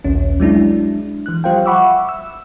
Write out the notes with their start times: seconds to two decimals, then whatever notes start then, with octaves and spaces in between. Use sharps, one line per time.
0.04 A#1 D#2 C#4
0.40 F#3 G#3 D4 E4
1.26 E3 F#6
1.44 F3 G3 F4 C5 F5 G5
1.66 E5 F#5 B5 C#6 D6 E6
2.09 E6